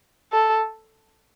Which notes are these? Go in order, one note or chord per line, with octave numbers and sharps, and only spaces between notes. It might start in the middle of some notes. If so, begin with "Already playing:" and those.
A4